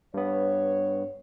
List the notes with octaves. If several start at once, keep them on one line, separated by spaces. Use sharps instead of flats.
G2 B3 C#5